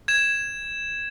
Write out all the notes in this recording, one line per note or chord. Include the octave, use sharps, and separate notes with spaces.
G#6 E7